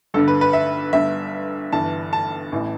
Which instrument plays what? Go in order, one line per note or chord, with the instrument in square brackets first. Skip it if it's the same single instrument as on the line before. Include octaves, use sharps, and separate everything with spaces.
[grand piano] G1 G2 D3 A4
B4
B4
E5
G1 G2 D3 E5
G1 G2 E3 A5
A5
A1 A2 E3